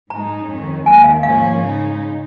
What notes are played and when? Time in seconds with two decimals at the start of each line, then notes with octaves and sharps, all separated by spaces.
0.10 G#2 G#3 D#4 A#5
0.49 F2 D#3 C#4
0.86 D#2 D#3 G#3 G#5
1.04 F5
1.23 G#2 F3 A#3 C#4 F5
1.61 C#3 G#3 D#4